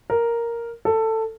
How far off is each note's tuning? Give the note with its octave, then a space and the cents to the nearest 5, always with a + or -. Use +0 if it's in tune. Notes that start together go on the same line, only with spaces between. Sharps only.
A#4 +0
A4 +15